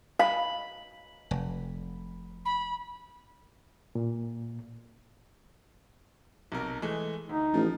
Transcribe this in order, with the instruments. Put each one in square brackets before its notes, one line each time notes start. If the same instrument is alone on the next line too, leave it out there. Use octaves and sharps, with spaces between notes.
[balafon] F5 [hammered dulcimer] B5
[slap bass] F1
[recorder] B5
[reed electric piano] A#2
[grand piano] B1 C3 A#4
E3 G#3 A3
[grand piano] D2 [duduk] D#4
[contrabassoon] A1 [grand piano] F3